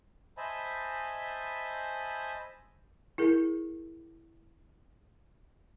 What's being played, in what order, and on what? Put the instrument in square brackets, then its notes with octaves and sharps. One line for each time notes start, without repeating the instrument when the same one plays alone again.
[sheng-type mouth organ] C5 D#5 E5 G#5 A5 B5
[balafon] E4 G#4 A#4